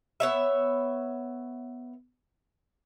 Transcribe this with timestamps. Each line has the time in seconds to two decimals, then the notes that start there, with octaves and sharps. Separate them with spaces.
0.20 B3 C#5 E5